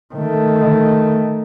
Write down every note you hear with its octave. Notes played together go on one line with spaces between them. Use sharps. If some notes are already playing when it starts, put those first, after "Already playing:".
D#3 A3